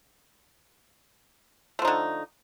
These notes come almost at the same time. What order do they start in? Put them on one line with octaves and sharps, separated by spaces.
A3 F3 D#4 D3